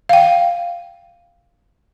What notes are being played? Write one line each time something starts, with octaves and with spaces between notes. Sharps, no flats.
F5 G5